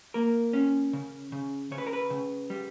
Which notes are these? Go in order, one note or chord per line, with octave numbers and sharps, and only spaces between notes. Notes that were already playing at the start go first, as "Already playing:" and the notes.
A#3 A#4
C#4
C#3
C#3
C#3 C#5
B4
A#4
B4
C#3
G3